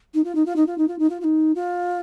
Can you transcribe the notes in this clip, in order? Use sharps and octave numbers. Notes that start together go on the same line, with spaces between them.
D#4
F4
D#4
F4
D#4
F4
D#4
F4
D#4
F4
F4
D#4
F4